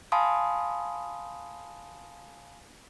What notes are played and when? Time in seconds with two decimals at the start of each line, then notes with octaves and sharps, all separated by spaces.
0.12 F5 G#5 A5 B5 C6 D#6